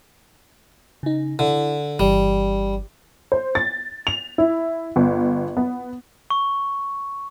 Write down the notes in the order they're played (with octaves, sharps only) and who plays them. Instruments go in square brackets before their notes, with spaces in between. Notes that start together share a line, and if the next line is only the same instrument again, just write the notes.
[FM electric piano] C#3 D#4
[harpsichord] D3 [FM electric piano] E4
[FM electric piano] G1 E3 [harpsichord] G3
[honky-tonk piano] C5
A6
F7
E4
G1
B3
[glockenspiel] C#6